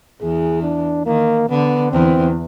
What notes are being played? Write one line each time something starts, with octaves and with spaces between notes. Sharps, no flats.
E2 E3 G#4
D4
D#3 A#3
D3 B3
E2 E3 C4